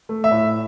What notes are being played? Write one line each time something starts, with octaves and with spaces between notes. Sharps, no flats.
A3
E5
A2